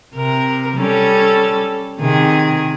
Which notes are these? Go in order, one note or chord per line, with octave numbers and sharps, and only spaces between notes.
C3 A#4
G3 C#4 A4
C3 D#3 G#4